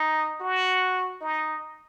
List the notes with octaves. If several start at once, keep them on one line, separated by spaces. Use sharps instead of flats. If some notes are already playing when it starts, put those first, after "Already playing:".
Already playing: D#4
F#4
D#4